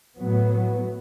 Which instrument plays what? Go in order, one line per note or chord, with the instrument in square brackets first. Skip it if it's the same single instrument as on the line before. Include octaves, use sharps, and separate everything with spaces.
[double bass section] A2 F#3 B3